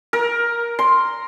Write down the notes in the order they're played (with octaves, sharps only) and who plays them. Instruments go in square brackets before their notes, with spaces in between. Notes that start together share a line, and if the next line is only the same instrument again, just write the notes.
[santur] A#4
C6